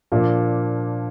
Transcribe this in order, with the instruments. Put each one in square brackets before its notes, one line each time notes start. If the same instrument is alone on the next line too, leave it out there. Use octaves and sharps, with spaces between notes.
[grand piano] A#2 F3 A#3 D4